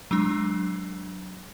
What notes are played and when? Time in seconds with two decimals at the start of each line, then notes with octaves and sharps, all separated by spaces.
0.11 F#3 G#3 D4